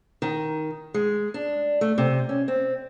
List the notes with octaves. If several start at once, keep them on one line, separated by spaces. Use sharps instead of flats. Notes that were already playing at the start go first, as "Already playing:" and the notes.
D#3
G#3
D4
A3
C3
C#4
C4